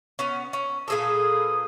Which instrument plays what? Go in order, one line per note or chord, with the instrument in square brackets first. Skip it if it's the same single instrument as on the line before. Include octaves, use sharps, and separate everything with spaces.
[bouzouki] B3 C#4
C#4
[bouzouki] A#2 G#4 A4 [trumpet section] B4 D#6